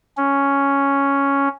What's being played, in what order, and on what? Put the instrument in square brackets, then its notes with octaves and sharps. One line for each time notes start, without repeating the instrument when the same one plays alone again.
[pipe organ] C#4